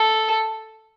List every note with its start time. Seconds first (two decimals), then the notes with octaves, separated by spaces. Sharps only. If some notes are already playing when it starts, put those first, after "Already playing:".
Already playing: A4